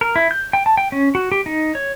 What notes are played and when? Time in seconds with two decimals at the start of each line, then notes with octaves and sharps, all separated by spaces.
0.01 A#4
0.16 E4
0.31 G6
0.53 G5
0.66 A5
0.77 G5
0.92 C#4
1.15 F#4
1.32 G4
1.46 D#4
1.75 C#5